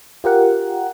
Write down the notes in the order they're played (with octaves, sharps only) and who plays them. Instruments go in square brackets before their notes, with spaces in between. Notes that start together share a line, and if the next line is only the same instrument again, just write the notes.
[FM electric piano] F4 G4 A#4 F#5